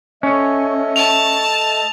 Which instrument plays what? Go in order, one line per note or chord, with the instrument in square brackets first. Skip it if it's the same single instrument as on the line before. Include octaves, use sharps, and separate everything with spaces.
[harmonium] A3 D#5 E5 [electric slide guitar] C#4
[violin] A5 [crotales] F7